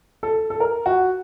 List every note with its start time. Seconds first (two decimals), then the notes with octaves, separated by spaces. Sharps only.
0.23 A4
0.50 A4
0.60 A#4
0.86 F#4